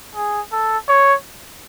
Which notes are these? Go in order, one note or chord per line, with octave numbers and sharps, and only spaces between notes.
G#4
A4
C#5